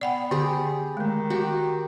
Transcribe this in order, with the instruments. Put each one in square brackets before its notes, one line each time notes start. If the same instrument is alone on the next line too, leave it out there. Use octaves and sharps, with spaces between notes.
[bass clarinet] B3 [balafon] D5 F#5 G5
[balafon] D3 [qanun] G4 G#4
[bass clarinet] D#3 [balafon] G#3 A3
[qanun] F#4 G4